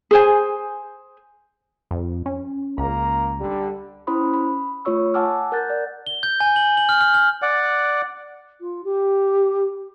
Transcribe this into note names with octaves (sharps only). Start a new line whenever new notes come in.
G#4 C5 G#5
F2
C#4
C#2 A#3 A#5
D3 G3
C#4 E4 C5 B5 C6 D#6
B5
A3 F4 C#5 C#6 E6
F#5 G#5 A5 D6 E6 F6
A#4 F#5 F#6 G6 A6
D5
G7
G6
G#5
F#7
F#7
F6
F6
F6
D5 F#5
F4
G4